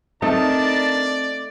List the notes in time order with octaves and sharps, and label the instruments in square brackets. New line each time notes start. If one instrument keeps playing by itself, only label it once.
[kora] A3 D#4 [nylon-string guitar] C4 [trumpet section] D4 A#4 A5 [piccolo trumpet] D5